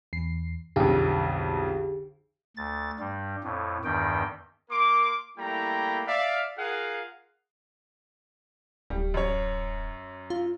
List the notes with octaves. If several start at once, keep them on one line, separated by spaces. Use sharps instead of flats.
E2 C7
B1 F2 D3 G4 G#4
D2 A6
G2 G3
F2 A2
E2 G2 D#3 G5
A#3 A#4 C6 D6
G3 A3 A#3 E4 G5 A#5
D5 E5 F5
F4 G#4 A#4 F5 F#5
D1 G3
F#2 C#5
F4